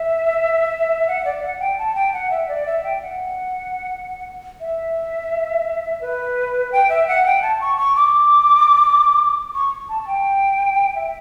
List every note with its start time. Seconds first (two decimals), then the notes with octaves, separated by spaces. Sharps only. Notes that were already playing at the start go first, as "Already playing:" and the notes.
Already playing: E5
1.08 F#5
1.25 D5
1.42 F#5
1.60 G5
1.78 A5
1.95 G5
2.13 F#5
2.31 E5
2.48 D5
2.66 E5
2.84 G5
3.02 F#5
4.61 E5
6.01 B4
6.72 G5
6.89 E5
7.08 F#5
7.26 G5
7.42 A5
7.61 C#6
7.78 C#6
7.96 D6
9.55 C#6
9.89 A5
10.02 A5
10.07 G5
10.95 E5